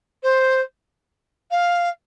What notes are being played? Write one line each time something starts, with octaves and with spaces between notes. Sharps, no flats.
C5
F5